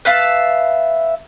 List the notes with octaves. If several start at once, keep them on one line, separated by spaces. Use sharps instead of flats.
B4 E5 F5 A5